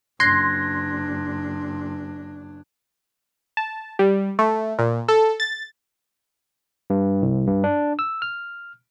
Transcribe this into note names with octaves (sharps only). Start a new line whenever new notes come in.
F#1 D4 C6 F#6 G#6 A#6
A5
G3
A3
A#2
A4
A6
G2
C2
G2
D4
E6
F6